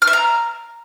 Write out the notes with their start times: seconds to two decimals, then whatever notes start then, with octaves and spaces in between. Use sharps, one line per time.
0.02 F6
0.07 E5
0.13 A#5